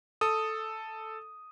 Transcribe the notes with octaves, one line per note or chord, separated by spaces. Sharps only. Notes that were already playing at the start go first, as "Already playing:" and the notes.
A4 D#6